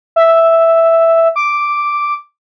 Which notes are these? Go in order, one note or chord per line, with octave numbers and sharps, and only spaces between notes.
E5
D6